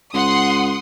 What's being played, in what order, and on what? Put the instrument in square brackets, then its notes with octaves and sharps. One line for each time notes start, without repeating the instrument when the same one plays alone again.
[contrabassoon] C#2 [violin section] F#5 C6 D#6